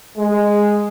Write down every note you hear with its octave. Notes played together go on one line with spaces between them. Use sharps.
G#3